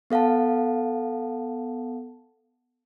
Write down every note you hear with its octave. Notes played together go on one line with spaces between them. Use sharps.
B3 A4 F5 F#5 A5